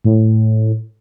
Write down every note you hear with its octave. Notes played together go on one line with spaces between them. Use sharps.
A2